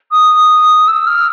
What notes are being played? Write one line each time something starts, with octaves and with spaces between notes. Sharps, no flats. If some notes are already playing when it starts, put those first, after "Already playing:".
D#6
E6
F6